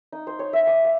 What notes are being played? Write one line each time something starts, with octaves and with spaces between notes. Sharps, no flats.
D#4
C5
C#5
E5
D6
F5